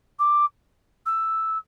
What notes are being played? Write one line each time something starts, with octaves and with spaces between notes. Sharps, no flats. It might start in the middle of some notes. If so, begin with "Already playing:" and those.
D6
E6